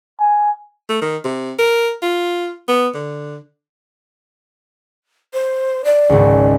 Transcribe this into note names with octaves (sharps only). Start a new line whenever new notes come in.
G#5
A3
D#3
C3
A#4
F4
B3
D3
C5
D5
G#1 C#2